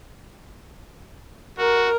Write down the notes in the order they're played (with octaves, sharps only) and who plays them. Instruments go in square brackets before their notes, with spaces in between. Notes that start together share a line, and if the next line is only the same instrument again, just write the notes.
[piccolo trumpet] F#4 [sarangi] A#4